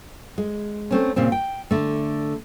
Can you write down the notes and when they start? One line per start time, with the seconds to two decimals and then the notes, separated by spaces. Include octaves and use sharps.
0.38 G#3
0.91 A3 C4 C#4
1.16 A#2 C#3 C4
1.32 G5
1.71 D3 A3